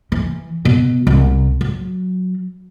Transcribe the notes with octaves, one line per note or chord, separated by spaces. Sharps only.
E3
B2
C2
F#3